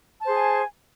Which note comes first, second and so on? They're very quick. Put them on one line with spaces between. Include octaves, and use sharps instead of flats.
A5 C5 G#4 G#5